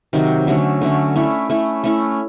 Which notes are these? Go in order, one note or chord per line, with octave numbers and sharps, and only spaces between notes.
C3 D#3 F#3
D3 F#3 A3 C#4
D3 F#3 A3 C#4
A3 C#4 E4
A3 C#4 E4
A3 C#4 E4